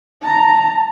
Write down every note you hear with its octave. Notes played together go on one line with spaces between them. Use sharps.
A5 A#5